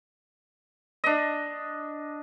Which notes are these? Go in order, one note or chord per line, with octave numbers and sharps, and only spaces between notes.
D4 D#5